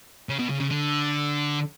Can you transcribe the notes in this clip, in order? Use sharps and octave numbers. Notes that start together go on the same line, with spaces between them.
C#3
B2
C#3
C#3
D3